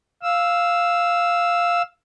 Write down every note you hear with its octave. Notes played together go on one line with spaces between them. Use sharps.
F5 E6